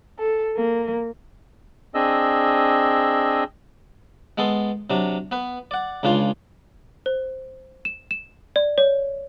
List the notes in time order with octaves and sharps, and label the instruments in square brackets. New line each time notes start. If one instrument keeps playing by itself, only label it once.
[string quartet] A4
A#3
[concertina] C4 D4 G#4 D#5 E6
[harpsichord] G#3 B3 A4 C6
C3 F#3 D4
B3 B4
D5 F#5
C#2 C#3 D4 F4 C6
[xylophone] C5
E7
E7
D5
C#5